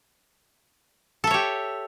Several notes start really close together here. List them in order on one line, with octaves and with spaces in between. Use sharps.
A4 E5 C#5 G4